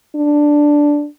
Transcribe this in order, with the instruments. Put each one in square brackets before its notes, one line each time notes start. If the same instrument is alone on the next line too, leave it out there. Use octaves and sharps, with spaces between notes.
[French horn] D4